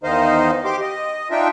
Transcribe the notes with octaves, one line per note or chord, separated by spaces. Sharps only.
E2 D#3 D#4 C5 D#5 F5
G4 C6 D6
D#5
D4 D#4 F4 E5 G5